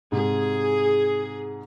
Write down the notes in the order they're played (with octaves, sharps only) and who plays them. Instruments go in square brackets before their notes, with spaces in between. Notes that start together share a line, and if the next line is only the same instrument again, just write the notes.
[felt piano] G#2 C3 [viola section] G#4